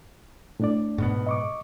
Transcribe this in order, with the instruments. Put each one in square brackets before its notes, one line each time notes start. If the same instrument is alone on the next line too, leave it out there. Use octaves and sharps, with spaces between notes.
[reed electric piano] A2 D4 D5
[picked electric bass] G#2 B2 B3
[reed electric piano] D#5 C#6 D6